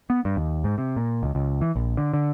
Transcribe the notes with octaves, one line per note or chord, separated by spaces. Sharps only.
B3
G2
D#2
G#2
C3
A#2
C#2
C#2
E3
A#1
D3
D3